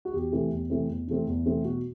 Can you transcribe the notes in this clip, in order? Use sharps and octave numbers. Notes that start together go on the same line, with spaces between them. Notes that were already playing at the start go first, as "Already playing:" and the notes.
F#4
E2 G4
C3 E3 A3 C4
E2
C3 E3 A3 C4
E2
C3 E3 A3 C4
E2
C3 E3 A3 C4
B2 F#4